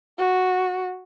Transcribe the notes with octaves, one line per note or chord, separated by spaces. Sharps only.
F#4